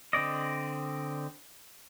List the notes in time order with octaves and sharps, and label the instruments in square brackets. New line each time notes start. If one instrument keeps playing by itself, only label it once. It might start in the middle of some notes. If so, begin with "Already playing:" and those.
[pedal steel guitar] D3 C4 D5 D#5